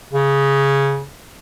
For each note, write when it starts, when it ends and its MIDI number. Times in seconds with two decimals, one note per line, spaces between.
0.13 1.03 49